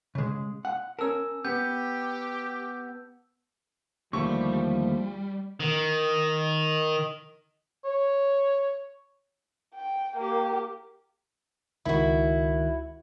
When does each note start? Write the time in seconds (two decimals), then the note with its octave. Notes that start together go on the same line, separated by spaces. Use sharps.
0.15 C#3 G#3
0.65 F#5
0.99 C#4 A#4 A5 E6
1.45 B3 G4 G6
4.13 D#2 D3 F3 G3 A3 C#6
5.60 D#3
7.85 C#5
9.75 G5
10.16 A#3 G4
11.85 C#2 D#3 E4 F#4 B5